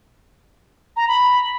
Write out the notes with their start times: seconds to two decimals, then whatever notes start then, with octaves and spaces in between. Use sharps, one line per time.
0.97 A#5
1.08 B5